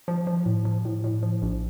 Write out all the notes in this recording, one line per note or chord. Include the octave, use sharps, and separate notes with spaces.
F3
F3
A2
F3
A2
A2
F3
A#1